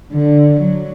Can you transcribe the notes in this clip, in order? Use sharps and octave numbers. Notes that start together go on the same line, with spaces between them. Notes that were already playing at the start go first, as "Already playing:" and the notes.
D3
F#3